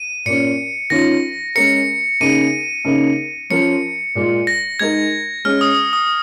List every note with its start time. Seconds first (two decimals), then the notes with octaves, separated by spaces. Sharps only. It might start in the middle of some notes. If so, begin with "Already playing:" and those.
Already playing: D#7
0.25 A#2 A#3 C#4 C#7
0.90 D#3 C#4 F4 A#6
1.55 G#3 C#4 A#4 C#7
2.21 C#3 A#3 D#4 G#4 D#7
2.85 C#3 A#3 D#4
3.50 F3 C#4 F4 A#4 C#7
4.15 A#2 G#3 F4
4.47 A#6
4.79 G#3 D#4 A#4 G#6
5.45 G#3 C#4 G#4 F6
5.61 D#6
5.93 D#6